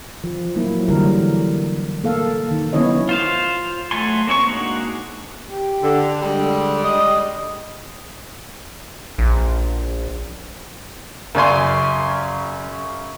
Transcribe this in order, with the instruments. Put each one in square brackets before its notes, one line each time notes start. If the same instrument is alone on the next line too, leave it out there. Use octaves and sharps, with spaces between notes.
[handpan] F3
F3 F#3 A#3 E4
D3 E3 F#3 G3 A#4
A#3 A4 F5
D#3
F#3 B3 C#4 E4 C#5 D#5
[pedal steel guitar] F4 C5 F5
F#3 A3 A4 G#5 C6
A#3 C4 C#5 C#6
G#3 A#3 D4 D#4 F#4
[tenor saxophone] G4
[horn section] D3
[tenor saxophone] D3 [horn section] G3 G#3
[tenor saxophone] D#5
[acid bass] A#1
[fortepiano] F#2 C#3 D5 G#5 C6